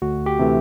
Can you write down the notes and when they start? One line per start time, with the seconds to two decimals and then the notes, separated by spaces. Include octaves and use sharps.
0.02 D2 F#4
0.26 G4
0.39 C3 E3 A3